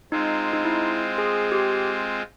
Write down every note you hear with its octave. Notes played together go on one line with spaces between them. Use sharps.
G#3 C4 D#4 F4
D#4
E4
G#4
G4